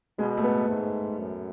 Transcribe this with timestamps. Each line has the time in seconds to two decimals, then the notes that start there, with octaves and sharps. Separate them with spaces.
0.19 B2 G#3
0.37 A3
0.44 B3
0.68 G#2 A3
1.19 F#2